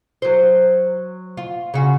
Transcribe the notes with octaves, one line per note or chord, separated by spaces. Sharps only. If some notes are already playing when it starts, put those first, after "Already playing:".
F#3 C5
F4
C#3 F#4